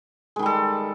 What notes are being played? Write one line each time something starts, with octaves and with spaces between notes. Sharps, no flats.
D#3 G3 G#3 A4